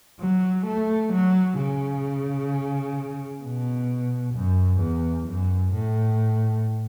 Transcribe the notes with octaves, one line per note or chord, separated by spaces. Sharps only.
F#3
A3
F#3
C#3
B2
F#2
E2
F#2
A2